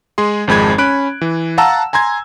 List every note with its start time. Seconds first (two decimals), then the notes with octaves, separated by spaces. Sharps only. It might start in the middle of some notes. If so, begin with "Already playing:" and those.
0.18 G#3 G#4 C6
0.48 G#1 F2 G#3 B5 G#6
0.78 C#4 B5 F#6 D7
1.21 E3
1.58 F5 F#5 A5 A#5 E6
1.93 G#5 A#5 C6 G#6